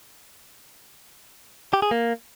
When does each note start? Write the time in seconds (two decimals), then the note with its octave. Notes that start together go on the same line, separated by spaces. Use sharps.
1.73 G4
1.82 G#4
1.91 A#3